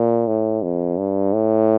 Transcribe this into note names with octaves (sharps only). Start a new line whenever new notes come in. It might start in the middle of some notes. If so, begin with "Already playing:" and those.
Already playing: A#2
A2
F2
G2
A2